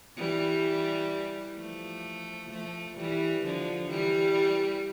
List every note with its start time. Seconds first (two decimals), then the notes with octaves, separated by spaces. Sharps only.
0.17 E3 G3
1.56 F3 A3
2.50 F3 A3
2.97 E3 G3
3.44 D3 F3
3.90 E3 G3